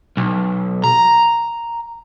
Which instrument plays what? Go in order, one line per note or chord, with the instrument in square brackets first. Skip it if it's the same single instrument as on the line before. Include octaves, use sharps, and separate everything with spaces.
[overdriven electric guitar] B1
A#5